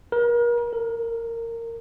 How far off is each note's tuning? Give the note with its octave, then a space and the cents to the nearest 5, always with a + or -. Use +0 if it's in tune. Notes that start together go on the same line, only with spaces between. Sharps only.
A#4 +35
A#4 -20